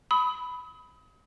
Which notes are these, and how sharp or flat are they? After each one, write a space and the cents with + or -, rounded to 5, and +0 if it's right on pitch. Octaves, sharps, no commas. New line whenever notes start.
B5 +5 D#6 +40